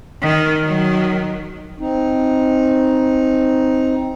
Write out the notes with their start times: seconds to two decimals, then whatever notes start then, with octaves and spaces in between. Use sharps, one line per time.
0.22 D#3
0.62 D#3 F#3
1.78 C4 D#4